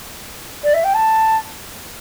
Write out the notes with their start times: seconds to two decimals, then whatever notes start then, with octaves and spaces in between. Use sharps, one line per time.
0.63 D5
0.73 E5
0.83 G5
0.93 A5